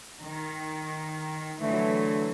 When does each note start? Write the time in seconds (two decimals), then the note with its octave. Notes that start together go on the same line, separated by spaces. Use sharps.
0.22 D#3
1.61 D3 E3 F#3 A3